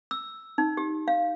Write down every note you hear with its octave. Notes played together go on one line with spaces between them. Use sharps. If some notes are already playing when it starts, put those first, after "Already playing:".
E6
D#4
G4
F5